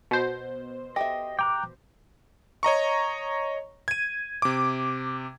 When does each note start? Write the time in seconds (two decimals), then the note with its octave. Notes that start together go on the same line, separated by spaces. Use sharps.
0.11 B2 C5
0.96 G4 A4 D#5 E5
1.39 G5 A#5 D6 F#6
2.63 C#5 D#5 A#5 C#6
3.88 G#6 D#7
4.42 C3 D6